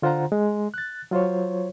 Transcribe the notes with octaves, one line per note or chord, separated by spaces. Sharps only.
D3 F4 C5 F#5 A#5
G#3
F#6 A6
F#3 F4 C5 C#5